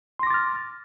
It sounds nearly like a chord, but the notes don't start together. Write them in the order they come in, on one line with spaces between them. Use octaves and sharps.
C6 A#6 D6 A6 F6